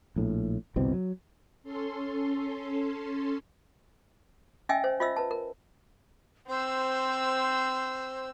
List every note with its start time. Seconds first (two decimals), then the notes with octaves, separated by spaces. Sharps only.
0.16 A#1 A2
0.76 G1 C2 B2 C4
0.94 F#3
1.63 C#4 A4 C6
4.69 C#4 D#5 E5 G5 G#5 E6
4.84 C5
5.00 F4 C5 D#5 E5 E6
5.17 B4 A5
5.31 A#4
6.48 C4 C5 E6